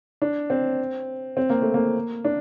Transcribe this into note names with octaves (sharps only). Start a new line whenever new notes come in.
D4
C4
C4
A#3
A3
A#3
D4